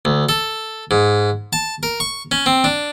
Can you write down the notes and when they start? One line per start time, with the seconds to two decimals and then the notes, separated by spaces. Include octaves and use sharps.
0.05 D2
0.29 A4
0.91 G#2
1.53 A5
1.83 A#4
2.00 C#6
2.31 C#4
2.46 C4
2.64 D4